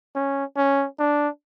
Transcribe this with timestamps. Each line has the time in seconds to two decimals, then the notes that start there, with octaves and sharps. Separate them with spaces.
0.15 C#4
0.57 C#4
0.99 D4